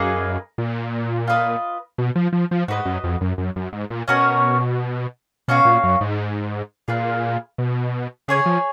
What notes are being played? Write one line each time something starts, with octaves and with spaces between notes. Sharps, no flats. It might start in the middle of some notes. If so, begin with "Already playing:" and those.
Already playing: F#2 A#3 D#4 G#4 B4
A#2
F4 B4 D#5
B2
F3
F3
F3
G#2 F#4 B4 D#5
F#2
F2
F#2
F#2
F#2
G#2
A#2
B2 C#4 F#4 A#4 C#5
B2 C#4 F#4 C#5 F5
A#2
F#2
G#2
A#2 F4 G#4 B4 F5
B2
C#3 G#4 C#5 G#5
F3